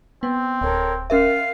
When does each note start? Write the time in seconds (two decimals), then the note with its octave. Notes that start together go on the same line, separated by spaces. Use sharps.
0.23 B3 C4
0.61 D1 A4 A#4 C#5
1.10 C#4 A#4 E5 F5